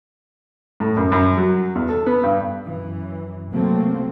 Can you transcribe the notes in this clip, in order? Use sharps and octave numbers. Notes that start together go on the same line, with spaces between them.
A2
F#2
F#2
F#3
E2
A4
B3
G2
F#2 E3
C3 F#3 A3 A#3 C4